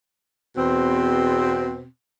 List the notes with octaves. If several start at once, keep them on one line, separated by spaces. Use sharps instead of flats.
E2 B2 C4